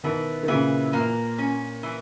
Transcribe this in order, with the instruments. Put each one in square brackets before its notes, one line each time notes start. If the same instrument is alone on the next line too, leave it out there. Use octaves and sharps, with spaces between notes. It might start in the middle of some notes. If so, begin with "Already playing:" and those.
[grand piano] B2 D#3 [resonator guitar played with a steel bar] E3
[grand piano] D#3
[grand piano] A#2 C#3 [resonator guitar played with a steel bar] E3
[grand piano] A#2 [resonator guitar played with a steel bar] A#3
[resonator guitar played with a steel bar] C#4
E3